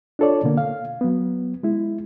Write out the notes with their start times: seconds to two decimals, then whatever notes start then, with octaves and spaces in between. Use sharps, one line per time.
0.19 D4 F4 A4 C#5 D5
0.44 B2 D3 A#3
0.58 F5
1.01 F#3 B3
1.63 G#3 E4